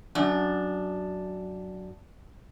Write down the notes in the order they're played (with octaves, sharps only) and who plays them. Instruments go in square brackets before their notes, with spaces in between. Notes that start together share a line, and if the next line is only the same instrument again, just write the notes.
[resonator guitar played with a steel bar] F#2 D4